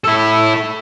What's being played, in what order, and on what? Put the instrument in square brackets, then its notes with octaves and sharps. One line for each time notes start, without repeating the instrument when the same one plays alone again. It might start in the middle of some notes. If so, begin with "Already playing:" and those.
[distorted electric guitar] E4 A4